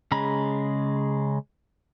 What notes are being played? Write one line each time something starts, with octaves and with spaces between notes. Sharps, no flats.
C#3 G#3 A#5 B5